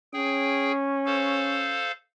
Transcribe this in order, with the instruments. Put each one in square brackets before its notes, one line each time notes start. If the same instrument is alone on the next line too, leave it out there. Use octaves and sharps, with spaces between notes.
[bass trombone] C#4 [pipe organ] G#4 G5
[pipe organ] A4 C5 F5